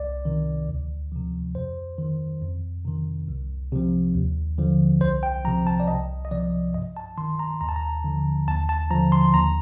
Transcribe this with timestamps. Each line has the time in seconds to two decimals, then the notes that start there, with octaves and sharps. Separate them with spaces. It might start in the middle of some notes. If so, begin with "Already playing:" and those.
Already playing: C2 D5
0.25 C3 D#3
0.69 D2
1.12 C3 F3
1.55 F2 C5
1.99 D#3
2.42 F2
2.85 C3 D#3
3.28 C2
3.72 C3 F3
4.14 D#2
4.58 D3 F3
5.01 C2 C5
5.23 G5
5.45 C3 F3 A#5
5.67 A5
5.80 D5
5.88 C2 D#5
6.25 D#5
6.31 C3 F3 D5
6.74 G2 D#5
6.97 A5
7.18 D#3 C6
7.39 A#5
7.61 D#2 A#5
7.69 A5
7.76 A#5
8.04 D3 F3
8.48 D#2 A5
8.69 A5
8.91 D3 F3 A#5
9.12 C6
9.34 D#2 A#5